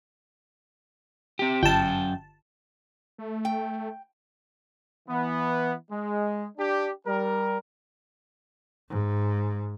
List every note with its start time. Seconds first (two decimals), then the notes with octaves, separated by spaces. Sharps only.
1.39 C4 G4
1.63 G1 F#2 G5 A5
3.18 A3
3.45 G5
5.08 E3 B3
5.91 G#3
6.58 D4 G4
7.06 G3 A#4
8.89 G#2